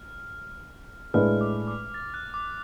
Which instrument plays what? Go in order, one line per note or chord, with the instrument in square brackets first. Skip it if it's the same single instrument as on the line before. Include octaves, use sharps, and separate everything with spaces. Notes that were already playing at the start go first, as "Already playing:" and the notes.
Already playing: [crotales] F6
[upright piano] A2 G#3 D4 G#4 B4 [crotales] F6
[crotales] D6
D6
A6
F#6
D6